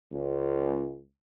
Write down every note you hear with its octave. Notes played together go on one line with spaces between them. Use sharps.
C#2